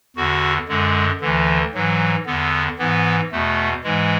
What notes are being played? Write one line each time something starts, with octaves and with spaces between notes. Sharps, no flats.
E2 D3 F#4
F#2 D3 G#3
D2 D3 E3
G#2 E3 F#3
E2 D3 B3
G#2 E3 B3
E2 B2 A3
G#2 E3 G#3